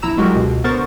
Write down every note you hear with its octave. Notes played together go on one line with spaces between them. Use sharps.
A#1 E4 A#5 E6 E7
F#3 G#3 F#4 G4 A#4
C#2 B2
D3 B3 A#4 C5 C#6 A6